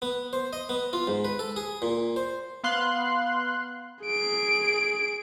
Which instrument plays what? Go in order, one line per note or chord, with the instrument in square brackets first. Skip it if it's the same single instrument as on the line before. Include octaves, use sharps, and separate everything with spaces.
[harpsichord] B3
C5
D#5
B3
F4
G#2
B4
A4
G#4
A#2
C5
[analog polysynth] B3 F5 C6 F#6
[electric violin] G#4 D7